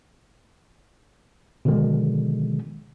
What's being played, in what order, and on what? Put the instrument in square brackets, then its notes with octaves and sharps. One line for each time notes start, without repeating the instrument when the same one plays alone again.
[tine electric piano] B2 D3 D#3 F3 G#3